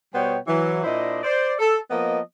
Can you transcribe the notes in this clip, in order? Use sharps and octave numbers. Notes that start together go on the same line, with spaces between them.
B2 G3 B3 C5 C#5 G5
E3 F#3
A#2 D4 E4 C5 D#5
C5 D5
A4
F3 A#3 B3 D#5